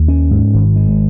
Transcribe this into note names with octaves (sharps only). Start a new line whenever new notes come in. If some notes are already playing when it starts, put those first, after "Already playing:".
Already playing: D#2
C#4
G#2
G#1
G#3